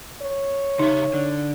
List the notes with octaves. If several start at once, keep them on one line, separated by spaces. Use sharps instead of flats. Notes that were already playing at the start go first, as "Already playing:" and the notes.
C#5
C#3 D#4 G4 E5
D3